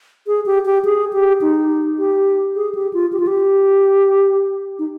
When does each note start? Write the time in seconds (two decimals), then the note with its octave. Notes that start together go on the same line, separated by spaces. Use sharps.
0.27 G#4
0.46 G4
0.65 G4
0.85 G#4
1.13 G4
1.41 D#4
1.98 G4
2.56 G#4
2.75 G4
2.94 F4
3.13 G4
3.20 F4
3.27 G4
4.79 D#4